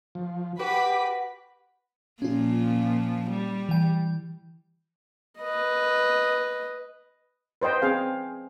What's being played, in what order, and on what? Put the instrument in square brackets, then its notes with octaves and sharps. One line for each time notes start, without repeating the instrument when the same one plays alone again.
[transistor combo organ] F3
[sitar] F#4 [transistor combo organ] G4 D6 [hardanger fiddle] B4 B5
[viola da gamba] A#2 F3 [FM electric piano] C#4 F4
[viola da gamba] G3
[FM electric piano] E3 G5
[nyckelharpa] B4 D#5
[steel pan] B4 C5 D#5 G5
C4 G#4 F5